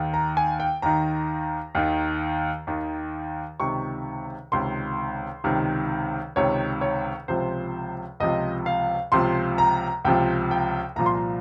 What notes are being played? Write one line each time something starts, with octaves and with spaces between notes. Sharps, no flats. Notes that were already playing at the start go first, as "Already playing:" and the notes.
Already playing: D#2 D#3
A#5
G#5
G5
D#2 D#3 A#5
D#2 D#3
D#2 D#3
C#2 C3 D#3 C#6
C#2 C3 D#3 C6
C#2 C3 D#3
C#2 C3 D#3 C#5
C#5
C#2 C3 F3 C5
C#2 C3 F3 D#5
F5
C#2 C3 F3 C6
A#5
C#2 C3 F3 G5
G5
C2 A#2 F3 A#5
C6
A#5